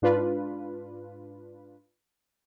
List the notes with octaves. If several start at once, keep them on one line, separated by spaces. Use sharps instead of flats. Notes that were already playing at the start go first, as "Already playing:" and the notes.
G#2 D4 F4 B4